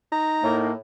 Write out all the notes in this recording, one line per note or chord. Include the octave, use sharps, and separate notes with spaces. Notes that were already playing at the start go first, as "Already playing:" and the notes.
D#4 A#5
A2 A#3